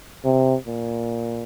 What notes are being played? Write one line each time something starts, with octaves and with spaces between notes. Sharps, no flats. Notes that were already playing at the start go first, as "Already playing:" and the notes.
C3
A#2